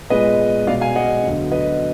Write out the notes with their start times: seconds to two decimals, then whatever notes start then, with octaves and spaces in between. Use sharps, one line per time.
0.10 A#2 G#3 B3 B4 D#5
0.67 B2 G#3 B3 D5 F5
0.81 F5 G#5
0.95 D#5 F#5
1.23 D2 D3 F#3 B3
1.52 B4 D#5